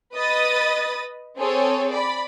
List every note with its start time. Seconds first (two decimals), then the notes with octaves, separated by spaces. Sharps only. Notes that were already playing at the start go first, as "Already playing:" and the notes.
0.15 B4 D#5 B5 D#6 A6
1.38 C4 G#4 A4 C#5
1.92 D5 B5